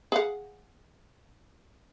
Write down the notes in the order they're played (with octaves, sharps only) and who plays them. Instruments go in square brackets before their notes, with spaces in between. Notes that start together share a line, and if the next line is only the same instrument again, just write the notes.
[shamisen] G#4 F5 F#5